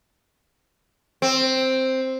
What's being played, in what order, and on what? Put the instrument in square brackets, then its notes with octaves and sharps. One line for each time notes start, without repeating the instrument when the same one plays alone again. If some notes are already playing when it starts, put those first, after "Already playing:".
[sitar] C4